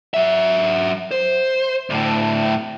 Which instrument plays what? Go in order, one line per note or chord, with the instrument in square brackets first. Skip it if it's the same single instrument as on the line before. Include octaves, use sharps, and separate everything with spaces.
[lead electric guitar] F#3 E5
C5
D2 A2